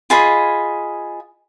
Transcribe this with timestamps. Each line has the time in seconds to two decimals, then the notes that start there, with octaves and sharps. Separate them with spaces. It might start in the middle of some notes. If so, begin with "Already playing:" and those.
0.10 F4 G#4 D#5 B5